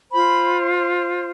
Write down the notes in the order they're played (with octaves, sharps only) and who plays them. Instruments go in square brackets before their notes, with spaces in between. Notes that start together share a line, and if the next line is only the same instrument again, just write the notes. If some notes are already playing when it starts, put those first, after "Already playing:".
[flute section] F4 C5 B5